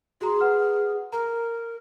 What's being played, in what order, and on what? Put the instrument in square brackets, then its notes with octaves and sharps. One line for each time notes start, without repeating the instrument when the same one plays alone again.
[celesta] F#4 A#5 C6 [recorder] G#4
[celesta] B4 F#5 F6
[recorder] A#4 [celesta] A#5